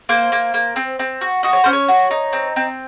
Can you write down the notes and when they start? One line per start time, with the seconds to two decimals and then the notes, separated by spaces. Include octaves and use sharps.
0.09 A#3 C5
0.32 A#3
0.54 A#3
0.76 C4
0.99 C4
1.21 F#4
1.43 F#4 D#5
1.53 C#5
1.64 C#4 C5
1.73 C#5
1.88 F#4
2.11 D#4
2.33 C4
2.56 C4